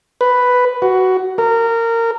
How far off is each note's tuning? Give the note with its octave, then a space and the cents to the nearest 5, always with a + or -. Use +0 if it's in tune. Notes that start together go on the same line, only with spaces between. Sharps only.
B4 +5
F#4 +15
A#4 -20